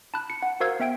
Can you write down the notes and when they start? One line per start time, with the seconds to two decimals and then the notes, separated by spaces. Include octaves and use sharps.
0.14 A5 B5 F#6
0.30 C#7
0.42 F#5
0.60 F#4 A#4 C5 F5 E6 G#6
0.80 B3 E5 G5 D7